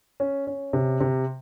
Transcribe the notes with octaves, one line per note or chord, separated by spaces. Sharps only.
C#4
C#4
C3
C3